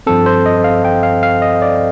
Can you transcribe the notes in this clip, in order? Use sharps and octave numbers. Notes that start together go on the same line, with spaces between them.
G2 F3 C4 A4
C5
D#5
F5
G5
F5
F5
D#5
D5